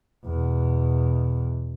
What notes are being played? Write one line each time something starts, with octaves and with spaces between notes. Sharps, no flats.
E2 B2